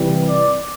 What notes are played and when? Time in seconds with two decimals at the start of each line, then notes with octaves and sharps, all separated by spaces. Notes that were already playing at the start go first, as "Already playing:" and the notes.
Already playing: C3 E3 G3
0.28 D5